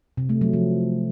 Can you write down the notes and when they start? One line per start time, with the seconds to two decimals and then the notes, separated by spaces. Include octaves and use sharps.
0.17 C3
0.29 A3
0.41 F#3
0.53 F3